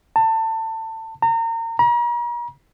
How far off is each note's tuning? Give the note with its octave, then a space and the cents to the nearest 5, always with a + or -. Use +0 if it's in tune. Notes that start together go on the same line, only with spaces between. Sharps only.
A5 +25
A#5 -35
A#5 +40